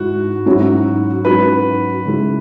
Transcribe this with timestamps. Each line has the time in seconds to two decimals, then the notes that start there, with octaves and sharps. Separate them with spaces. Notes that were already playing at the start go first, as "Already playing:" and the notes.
Already playing: G#2 E4 F#4
0.46 G#2 F#3 C#4 E4
1.25 G#2 F#3 C#4 E4 B4
2.04 C#3 G#3 E4